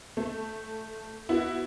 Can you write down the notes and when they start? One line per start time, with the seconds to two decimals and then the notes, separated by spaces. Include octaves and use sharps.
0.17 A3
1.29 B3 E4 F#4